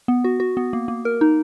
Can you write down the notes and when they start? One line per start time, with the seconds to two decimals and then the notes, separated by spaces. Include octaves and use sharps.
0.08 B3
0.24 F#4
0.40 F#4
0.57 B3
0.73 A#3
0.88 A#3
1.05 A#4
1.21 D#4